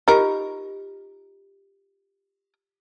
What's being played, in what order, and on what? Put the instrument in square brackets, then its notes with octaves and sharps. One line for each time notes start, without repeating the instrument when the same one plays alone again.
[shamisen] D#4 A#4 [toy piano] F4 G4